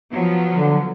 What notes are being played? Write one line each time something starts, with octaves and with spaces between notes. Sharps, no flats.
F3 F#3 B3
D3